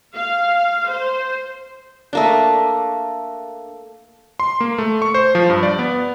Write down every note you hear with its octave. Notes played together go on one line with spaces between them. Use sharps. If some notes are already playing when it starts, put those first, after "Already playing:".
F5
C5
A3 A#3 D4
C6
A#3
A3
C#6
C5
F3
G2
D5
B3